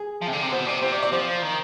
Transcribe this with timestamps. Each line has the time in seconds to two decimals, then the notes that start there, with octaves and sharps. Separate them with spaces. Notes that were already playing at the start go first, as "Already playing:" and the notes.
Already playing: G#4
0.21 F3
0.27 C3
0.32 D3
0.43 C3
0.52 B2 C5
0.67 C3 D5
0.82 C3 C5
0.92 D5
1.03 D5
1.12 F3 C5
1.42 D#3